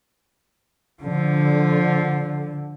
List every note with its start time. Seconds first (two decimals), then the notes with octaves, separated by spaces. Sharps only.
1.03 D3 F3